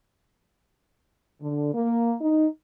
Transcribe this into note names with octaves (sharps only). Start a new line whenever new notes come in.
D3
A#3
D#4